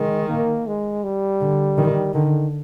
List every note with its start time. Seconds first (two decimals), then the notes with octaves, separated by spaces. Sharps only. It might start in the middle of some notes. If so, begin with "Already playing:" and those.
Already playing: D#3 G#3
0.29 A#3
0.67 G#3
1.04 G3
1.41 D3
1.78 D#3
2.14 D3 D#3